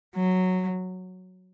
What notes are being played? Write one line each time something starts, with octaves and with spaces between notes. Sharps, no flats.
F#3